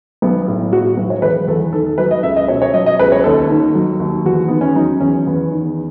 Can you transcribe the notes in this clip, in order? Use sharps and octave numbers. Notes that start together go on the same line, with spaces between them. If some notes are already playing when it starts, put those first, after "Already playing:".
B1 B3
A2
F#3 F#4
F#4
B1
C#5
E1 B4
E2 A4
D#3 A4
A4
F#3 B4
D#5
C#2 E5
D#5
B2 C#5
C#5
F#3 D#5
D#5
C#2 B4
C#5
D#2 A4
D#3
F#3
D#2
E2 F#4
D#3 B3
C#4
F#3 D#4
E2 C#4
E2 B3
D#3